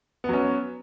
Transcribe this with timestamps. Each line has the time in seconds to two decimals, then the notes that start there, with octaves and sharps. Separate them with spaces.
0.24 B3
0.29 F#3
0.33 C#4